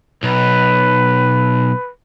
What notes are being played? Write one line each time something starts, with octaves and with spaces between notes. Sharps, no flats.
B1 B4